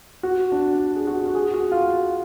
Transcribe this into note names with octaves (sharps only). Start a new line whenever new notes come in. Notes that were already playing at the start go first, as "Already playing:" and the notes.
F#4
D4
F#4
G#4
F#4
F#4
G#4
F#4
F4